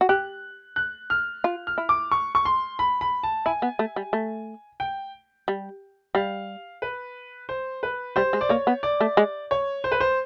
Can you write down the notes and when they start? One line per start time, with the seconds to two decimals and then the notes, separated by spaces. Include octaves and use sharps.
0.01 F#4
0.09 G4 F#6
0.76 F#6
1.10 F6
1.44 F4
1.67 F6
1.78 E4
1.89 D6
2.12 C#6
2.35 C#6
2.45 C6
2.79 B5
3.01 B5
3.23 A5
3.46 E4 G#5
3.62 B3
3.79 A3
3.96 G3
4.13 A3
4.80 G5
5.48 G3
6.15 G3 F5
6.82 B4
7.49 C5
7.83 B4
8.16 G3 C5
8.33 G#3
8.41 D5
8.49 A#3 C#5
8.67 B3
8.83 D5
9.00 A3
9.17 G#3
9.51 C#5
9.84 C5
9.92 B4
10.00 C5